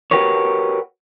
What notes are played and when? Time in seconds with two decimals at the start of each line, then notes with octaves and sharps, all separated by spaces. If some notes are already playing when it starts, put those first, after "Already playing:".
0.11 F#4 G4 A#4 B4 C#5